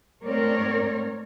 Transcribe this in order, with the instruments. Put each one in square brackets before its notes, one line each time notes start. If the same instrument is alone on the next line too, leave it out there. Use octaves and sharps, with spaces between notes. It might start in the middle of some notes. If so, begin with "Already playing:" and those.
[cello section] G#2 A3 C4 A#4 C#5 D5